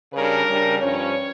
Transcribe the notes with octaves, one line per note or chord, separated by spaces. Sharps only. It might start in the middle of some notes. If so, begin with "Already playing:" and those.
C#3 G3 D4 A#4
C#3 G3 D4
G2 F3 C#4 C#5